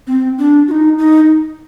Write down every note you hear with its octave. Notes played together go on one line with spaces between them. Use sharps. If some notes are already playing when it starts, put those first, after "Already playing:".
C4
D4
F#4
D#4
D#4